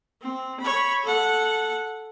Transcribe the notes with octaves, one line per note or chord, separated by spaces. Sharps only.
C4
C#5 B5
A4 F#5